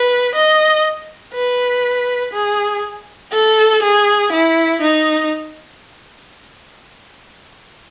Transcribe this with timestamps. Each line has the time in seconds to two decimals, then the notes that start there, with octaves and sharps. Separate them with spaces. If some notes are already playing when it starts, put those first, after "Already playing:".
Already playing: B4
0.34 D#5
1.33 B4
2.33 G#4
3.33 A4
3.82 G#4
4.33 E4
4.82 D#4